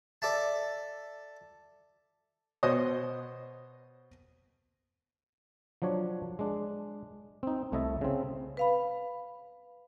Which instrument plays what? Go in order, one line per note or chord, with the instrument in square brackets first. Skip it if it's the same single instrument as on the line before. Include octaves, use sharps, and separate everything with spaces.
[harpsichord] A4 D5 E5 A5
[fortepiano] B2 C5 C#5 D#5 D#6
[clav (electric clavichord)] F3 F#3 D4 C#5
G#3 D4
C4 D#4
C2 A3 E4 D#5 E5 A5
C#3 C4
[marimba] B4 F5 B5